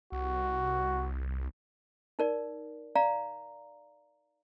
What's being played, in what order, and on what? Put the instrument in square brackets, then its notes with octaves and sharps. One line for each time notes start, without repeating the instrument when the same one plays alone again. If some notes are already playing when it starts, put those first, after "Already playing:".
[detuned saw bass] C2 [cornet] F#4
[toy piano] D#4 A#4 D5
D5 F5 A#5